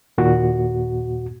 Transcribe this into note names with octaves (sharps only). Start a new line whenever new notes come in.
D#2 A#2 F#4